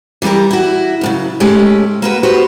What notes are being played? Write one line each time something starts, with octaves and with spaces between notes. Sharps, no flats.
E3 G3 F4 G4 A#4
E4 F#4
F#2 A2 C#3
G#2 G#3 A3 C#4 G4
A#3 F#4 B4
F#4 G4 B4 C5